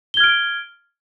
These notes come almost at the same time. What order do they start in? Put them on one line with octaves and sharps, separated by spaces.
G7 G#6 F6 D7